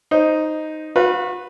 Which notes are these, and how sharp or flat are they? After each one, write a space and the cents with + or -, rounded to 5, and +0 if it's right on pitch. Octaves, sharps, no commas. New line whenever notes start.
D#4 +0 C5 +0
F#4 -35 B4 +0 F5 +0